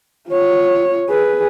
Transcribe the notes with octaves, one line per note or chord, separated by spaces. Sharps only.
F4 C#5
G#4 B4